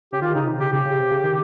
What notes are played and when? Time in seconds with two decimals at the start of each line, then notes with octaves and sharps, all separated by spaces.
0.12 C#3 G4
0.22 D#3 F4
0.35 C#3 D#4
0.47 C3
0.60 C#3 G4
0.72 C#3 G4
0.85 C#3
0.99 C3
1.11 C#3
1.24 D#3